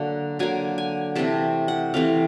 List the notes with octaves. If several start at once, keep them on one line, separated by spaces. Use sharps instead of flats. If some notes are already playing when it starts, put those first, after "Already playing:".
Already playing: D3 F#3 A#3 F#5
D3 F#3 A#3 G#5
G#5
C3 E3 A3 C4 A5
F#5
C3 E3 A3 C4 F5